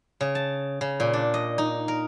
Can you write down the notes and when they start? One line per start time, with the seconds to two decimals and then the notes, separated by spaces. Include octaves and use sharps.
0.21 C#3
0.35 A5
0.81 C#3
1.00 A#2
1.13 D4
1.34 D#5
1.58 D#4
1.88 A#4